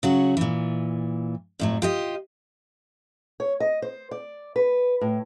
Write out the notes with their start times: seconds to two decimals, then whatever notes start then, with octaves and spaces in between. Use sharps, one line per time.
0.03 C#3 F#3 F#4
0.37 A#2 E3
1.59 F2 A2 F#3
1.82 F4 G4 D#5
3.40 C#5
3.60 D#5
3.82 C5
4.11 D5
4.56 B4
5.01 A2